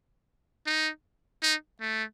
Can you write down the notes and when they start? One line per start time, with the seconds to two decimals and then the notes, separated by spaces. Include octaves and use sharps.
0.66 D#4
1.43 D#4
1.81 A3